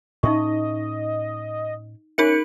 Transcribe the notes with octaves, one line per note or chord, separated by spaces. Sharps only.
A2 C#4 D#4 D#5 E5 C#6
C#4 D#4 G#4 A#4 E5 C#7